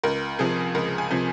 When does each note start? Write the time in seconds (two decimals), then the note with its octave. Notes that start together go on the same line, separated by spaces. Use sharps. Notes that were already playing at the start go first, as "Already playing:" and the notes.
0.04 C#2 A#4
0.39 C3 F3 G#4
0.75 C#2 A#4
0.98 G#5
1.11 C3 F3